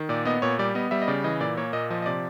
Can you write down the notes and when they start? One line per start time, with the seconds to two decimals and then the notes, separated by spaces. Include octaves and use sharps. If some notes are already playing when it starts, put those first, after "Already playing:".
Already playing: D#3
0.09 A#2 D5
0.25 B3 D#5
0.42 A#2 C#5
0.59 G3 D5
0.75 B3 D#5
0.91 G3 E5
1.02 D#5
1.08 C#3 D5
1.24 E3 D#5
1.40 A#2 D5
1.57 A#3 C#5
1.73 A#2 D#5
1.90 F3 D#5
2.02 D#5
2.06 C3 D5